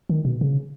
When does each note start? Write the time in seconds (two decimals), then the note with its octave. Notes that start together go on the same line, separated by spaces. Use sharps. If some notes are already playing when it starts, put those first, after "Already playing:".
0.09 D#3
0.25 B2
0.41 C#3